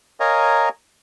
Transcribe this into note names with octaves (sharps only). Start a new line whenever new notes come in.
A#4 C#5 D#5 F5 G#5 A#5